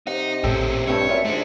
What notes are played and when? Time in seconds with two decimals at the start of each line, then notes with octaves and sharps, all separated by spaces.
0.07 C3 D#4 D#5 F#5
0.44 A1 A#2 C#4 G4 A4
0.87 G2 A3 C4 G4 C#5
1.09 F#2 F4 D5 E5
1.25 G#2 A3 D4